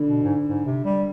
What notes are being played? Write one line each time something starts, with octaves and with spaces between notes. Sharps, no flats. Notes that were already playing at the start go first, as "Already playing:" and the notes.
Already playing: D3
B2
G#2
G#2
C3
G3